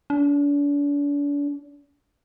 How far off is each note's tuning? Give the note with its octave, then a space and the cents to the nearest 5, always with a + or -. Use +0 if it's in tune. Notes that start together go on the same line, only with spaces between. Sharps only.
D4 -40